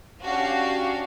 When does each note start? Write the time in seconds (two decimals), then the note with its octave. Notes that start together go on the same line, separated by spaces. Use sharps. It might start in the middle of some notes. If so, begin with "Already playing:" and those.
0.22 C#4 D4 F#4 G4 F5 A5